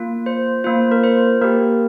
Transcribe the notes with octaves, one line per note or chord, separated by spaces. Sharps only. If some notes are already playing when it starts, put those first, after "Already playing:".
Already playing: A#3 F4
C5
A#3 F4 C5
A#4
C5
A#3 G4 A#4